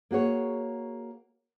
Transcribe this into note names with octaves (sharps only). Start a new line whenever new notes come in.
A#3 F#4 G#4 C#5